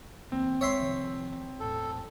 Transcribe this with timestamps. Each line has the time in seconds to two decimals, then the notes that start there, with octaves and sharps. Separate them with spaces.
0.32 C#2 E3 A#3 C4
0.61 B1 F#3 G#3 C#5 E5 C6
0.80 C3 D#3 F3
1.60 E1 A2 A4